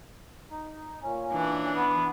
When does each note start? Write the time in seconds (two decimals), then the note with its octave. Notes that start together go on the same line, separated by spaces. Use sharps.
0.51 D#4
1.03 A#2 C#4
1.32 E3 D4
1.76 B3